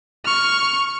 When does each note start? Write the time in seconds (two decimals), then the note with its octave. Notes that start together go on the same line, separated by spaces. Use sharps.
0.25 C#6 F6